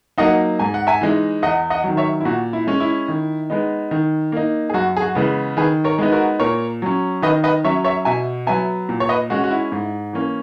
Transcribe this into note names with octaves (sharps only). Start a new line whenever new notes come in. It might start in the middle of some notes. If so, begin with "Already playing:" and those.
F#3 A#3 D#4 D#5 F#5
G#2 G#5
F#5
E5 G#5
E3 G#3 D#4
E2 D#5 F#5
D#5 F#5
D#3 F#3
C#5 E5
E4
A#2 F#4
E4
G#3 C#4
E4
D#3
G#3 B3 D#4
D#3
A#3 D#4
G#4
F#2 F#4
G#4
F#4
C#3 E3 G#3 B3
D#3 G#4 B4
A#4 C#5
G#3 B3 D#4
F#4 A#4
A#2 A#4 C#5
F#3 C#4
D#3 B4 D#5
B4 D#5
F#3 C#4 C#5 E5
C#5 E5
B2 E5 G#5
F#3 B3 E5 G#5
A#2
C#5
B4 D#5
G#3 C#4 F#4
F#4
E4
G#2
E3 A#3 C#4